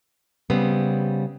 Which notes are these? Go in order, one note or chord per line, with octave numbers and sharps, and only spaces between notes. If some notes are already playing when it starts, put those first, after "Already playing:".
C#3 G3 B3 C4